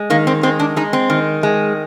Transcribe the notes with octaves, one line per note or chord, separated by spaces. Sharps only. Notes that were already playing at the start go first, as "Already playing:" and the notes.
Already playing: G#3
D#3 A#3
C4
G#3 C4
D4
G#3 D#4
C4
D#3
G#3